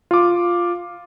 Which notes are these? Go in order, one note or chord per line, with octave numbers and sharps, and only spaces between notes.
F4 D6